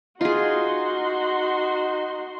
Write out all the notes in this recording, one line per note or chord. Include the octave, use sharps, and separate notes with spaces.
D#4 F4 F#4 G#4 C6